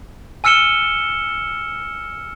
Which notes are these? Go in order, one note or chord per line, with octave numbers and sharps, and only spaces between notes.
G#5 E6 F6 C#7 E7 G7